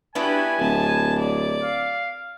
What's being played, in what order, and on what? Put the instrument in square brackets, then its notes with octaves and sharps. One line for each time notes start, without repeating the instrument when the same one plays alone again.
[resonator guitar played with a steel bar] B3 D4 E4 [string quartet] F#4 G4 B4 [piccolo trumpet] G#5
[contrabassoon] D1 [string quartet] A5
[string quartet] D5
[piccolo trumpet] F5